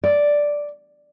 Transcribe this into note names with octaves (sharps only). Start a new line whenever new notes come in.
D5